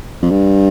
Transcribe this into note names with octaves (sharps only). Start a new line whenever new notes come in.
F2
G2